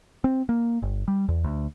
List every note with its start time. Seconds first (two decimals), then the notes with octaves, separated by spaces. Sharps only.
0.24 C4
0.49 A#3
0.82 G1
1.08 G3
1.28 E2
1.44 D2